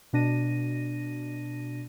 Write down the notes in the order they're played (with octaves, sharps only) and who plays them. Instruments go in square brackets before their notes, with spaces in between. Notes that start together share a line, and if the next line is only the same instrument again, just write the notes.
[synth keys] B2 D4 A#6 D#7